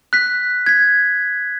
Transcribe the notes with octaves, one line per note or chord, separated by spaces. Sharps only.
F#6 B6
G#6 B6